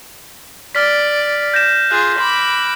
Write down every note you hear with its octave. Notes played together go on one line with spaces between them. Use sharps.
D5 F6 B6
G6 A#6 E7
F4 G#4 F#6
B5 D6